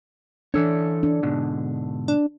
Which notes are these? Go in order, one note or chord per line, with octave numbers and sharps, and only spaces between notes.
E3 D4 A4 C#5
D4
G#2 B2 D3
D4